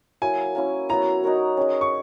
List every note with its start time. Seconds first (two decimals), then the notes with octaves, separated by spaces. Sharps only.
0.22 F#3 A#3 E4 G#5
0.55 A#3 C#4 E4
0.89 F#3 B3 E4 A#5
1.24 D#4 F#4 A#4 C#5
1.57 C#4 G#4 D#5
1.81 C#6